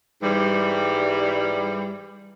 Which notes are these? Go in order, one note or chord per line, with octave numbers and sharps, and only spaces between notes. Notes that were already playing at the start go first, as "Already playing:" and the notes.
G#2 E3 G3